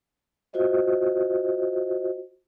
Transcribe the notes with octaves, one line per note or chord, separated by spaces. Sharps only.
F4 F#4 C5 D#5 E5